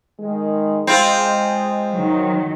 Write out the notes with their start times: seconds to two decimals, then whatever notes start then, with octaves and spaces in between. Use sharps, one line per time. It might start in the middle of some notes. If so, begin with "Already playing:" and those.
0.19 D#3 G#3
0.87 G#3 C4 F4
1.91 D#3 F#3